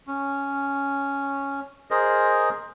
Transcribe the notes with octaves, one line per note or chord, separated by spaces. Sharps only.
C#4
G#4 A#4 C5 D#5